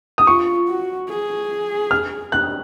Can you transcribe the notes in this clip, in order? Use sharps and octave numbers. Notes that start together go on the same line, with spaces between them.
D#6
F4 C#6
F#4
G#4
F6
F#6